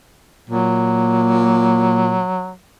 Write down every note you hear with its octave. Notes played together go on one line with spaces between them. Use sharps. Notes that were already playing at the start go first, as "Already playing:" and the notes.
A#2 F#3